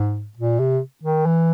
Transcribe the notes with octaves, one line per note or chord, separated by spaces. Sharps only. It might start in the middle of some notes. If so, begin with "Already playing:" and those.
Already playing: G#2
A#2
C3
D#3
E3